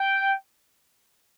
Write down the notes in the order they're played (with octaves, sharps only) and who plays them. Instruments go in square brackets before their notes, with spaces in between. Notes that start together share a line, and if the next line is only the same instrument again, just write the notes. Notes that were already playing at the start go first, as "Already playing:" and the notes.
Already playing: [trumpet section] G5